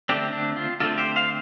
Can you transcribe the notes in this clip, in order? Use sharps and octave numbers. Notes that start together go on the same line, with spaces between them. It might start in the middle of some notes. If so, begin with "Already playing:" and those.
D3 A3 C4 D4 G4
D4
F4
D3 A3 C4 F4 A4
G4 C5
C5 F5